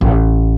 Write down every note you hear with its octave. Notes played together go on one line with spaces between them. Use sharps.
A1